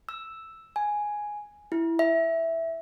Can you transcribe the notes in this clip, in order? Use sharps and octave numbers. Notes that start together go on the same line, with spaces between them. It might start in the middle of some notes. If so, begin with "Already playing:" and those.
E6
G#5
E4
E5